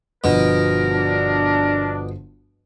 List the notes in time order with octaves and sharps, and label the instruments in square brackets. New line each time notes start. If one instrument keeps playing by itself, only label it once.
[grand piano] G1 D3 F3 [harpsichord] B2 [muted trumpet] A#4
[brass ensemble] D4